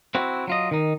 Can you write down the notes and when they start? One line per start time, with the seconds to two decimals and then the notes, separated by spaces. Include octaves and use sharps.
0.15 C4 E4 F#4
0.47 F#3 F4 D#5
0.71 D#3 D#4